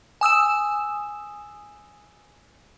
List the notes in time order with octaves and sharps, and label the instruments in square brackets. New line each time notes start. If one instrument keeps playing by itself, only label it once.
[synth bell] G#5 D#6 E6 E7